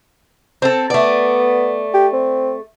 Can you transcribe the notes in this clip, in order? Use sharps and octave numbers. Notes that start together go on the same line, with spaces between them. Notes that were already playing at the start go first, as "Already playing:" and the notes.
C4 A4
A3 B3 D5
G4
C4